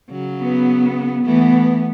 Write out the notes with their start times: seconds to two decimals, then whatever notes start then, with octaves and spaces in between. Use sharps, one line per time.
0.11 C#3 F#3
0.40 B3
1.24 E3 A3 B3